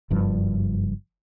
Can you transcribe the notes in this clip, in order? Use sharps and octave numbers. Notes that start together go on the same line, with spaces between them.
F#1 G2 F3